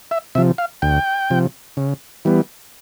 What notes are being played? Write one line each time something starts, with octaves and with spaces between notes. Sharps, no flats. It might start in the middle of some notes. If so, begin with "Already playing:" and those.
E5
C3 F3 E5
F5
D2 G5
C3 F3
C#3
E3 G3 B3